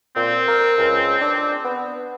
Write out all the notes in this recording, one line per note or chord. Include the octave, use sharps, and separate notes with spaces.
A#2 C4
A#4
C#2
D4
B3